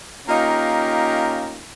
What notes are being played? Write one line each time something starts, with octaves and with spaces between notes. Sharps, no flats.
A#3 C#4 D#4 F4 G4